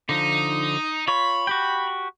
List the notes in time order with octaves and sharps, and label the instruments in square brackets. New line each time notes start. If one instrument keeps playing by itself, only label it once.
[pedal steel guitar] D3 F3 [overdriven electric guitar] D#4
[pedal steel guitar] F4 C#5 [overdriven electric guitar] B5
[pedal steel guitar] F#4 G4 G5